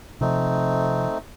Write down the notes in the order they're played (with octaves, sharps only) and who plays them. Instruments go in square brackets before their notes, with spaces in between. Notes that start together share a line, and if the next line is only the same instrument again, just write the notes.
[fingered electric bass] C3 F3 [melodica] A3 C4 D#4